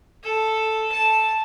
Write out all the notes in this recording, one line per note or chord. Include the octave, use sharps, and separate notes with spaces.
A4
A5